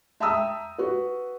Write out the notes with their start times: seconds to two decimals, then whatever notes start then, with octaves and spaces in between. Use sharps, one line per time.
0.20 E5 G5 A5 A#5 D#6 E6
0.78 F#4 B4